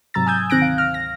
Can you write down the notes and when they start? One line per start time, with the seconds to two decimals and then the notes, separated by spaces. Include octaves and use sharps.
0.14 G#2 C3 F#3 A#5 E6 A6
0.26 G#5 D#6 E6 G6 G#6
0.50 D2 D#3 C4 F#6 A#6 D7
0.62 F5
0.78 F6
0.94 A#6